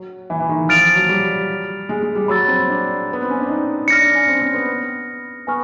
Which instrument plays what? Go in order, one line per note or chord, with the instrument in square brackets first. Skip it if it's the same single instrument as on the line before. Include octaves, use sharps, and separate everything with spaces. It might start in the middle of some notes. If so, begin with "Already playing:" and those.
Already playing: [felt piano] F#3
E3
E3
D#3
[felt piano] F3 [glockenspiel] F6 A6 D7 F7
[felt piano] F#3
G3
G#3
G#3
G3
[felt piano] F#3 [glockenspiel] B5 E6 A6
[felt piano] C4
D4
B3
C4
C#4
D4
D#4
[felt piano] D4 [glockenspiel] F6 A#6 C#7
[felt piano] D4
C#4
C4
C4
B3
[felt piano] B3 [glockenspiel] G#5 C#6 F6